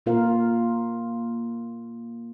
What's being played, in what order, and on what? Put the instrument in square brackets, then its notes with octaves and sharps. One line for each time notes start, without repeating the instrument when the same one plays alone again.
[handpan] A#2 A#3 F4 A#4 F5